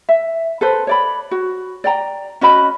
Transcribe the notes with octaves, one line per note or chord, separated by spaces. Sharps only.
E5
A4 B4 C5
C#5 D5 B5
F#4
D5 G5 A#5
C#4 F#4 D#5 B5